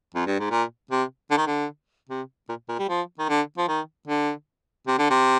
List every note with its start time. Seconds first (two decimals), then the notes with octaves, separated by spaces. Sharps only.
0.15 F2
0.27 G2
0.39 G#2
0.51 A#2
0.91 C3
1.31 D3
1.38 D#3
1.47 D3
2.10 C3
2.49 A#2
2.69 A#2
2.79 G3
2.89 F3
3.19 D#3
3.29 D3
3.58 F3
3.68 D#3
4.08 D3
4.87 C3
4.99 D3
5.10 C3